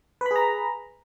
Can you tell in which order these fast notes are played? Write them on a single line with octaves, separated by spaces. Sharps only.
B4 B5 G#4 A#5